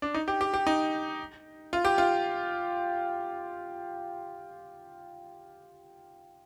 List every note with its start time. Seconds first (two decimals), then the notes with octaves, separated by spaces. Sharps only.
0.02 D4
0.14 D#4
0.28 G4
0.41 G4
0.54 G4
0.67 D#4
1.73 F4
1.85 G4
1.98 F4